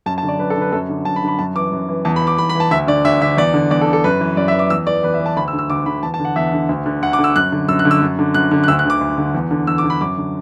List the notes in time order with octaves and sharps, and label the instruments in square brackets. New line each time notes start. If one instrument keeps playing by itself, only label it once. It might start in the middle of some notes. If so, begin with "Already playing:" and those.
[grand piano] F#2 A5
A5
D3
D5
F#2 B4
A4
D3
B4
F#2 A4
D3
F#2 A5
B5
D3
B5
F#2 A5
E3 D6
F#2
E3
E2 A5
B5
E3
D6
E2 B5
B5
E3
A5
D2 E5
D3 D5
D2 E5
D3 E5
E2 D5
D3
E2 D5
A4
D3
A4
F#2 B4
E3
F#2 D5
E5
E3
D6
E2 E6
E3 D5
E2 B4
E5
E3
A5
D2 B5
E6
D3
E6
D2 D6
D3 B5
E2 A5
A5
D3
F#5
E2 E5
D3
D2
D3
D2 F#5
D6
D3
E6
F#2 F#6
D3
F#2 E6
F#6
D3
E6
F#2
D3
F#2 F#6
D3
F#6
D2 E6
F#6
D3 D6
D2
D3
E2
D3
E2 E6
D6
D3
B5
F#2 D6
D3